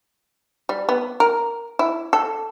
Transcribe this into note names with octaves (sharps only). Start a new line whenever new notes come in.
G3
B3
A#4
E4
A4